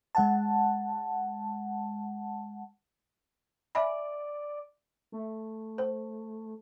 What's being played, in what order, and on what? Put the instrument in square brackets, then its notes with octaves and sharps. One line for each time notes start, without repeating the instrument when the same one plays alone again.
[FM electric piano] G#3 F#5 A5
[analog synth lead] D5 [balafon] E5 G#5 B5
[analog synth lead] A3
[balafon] C5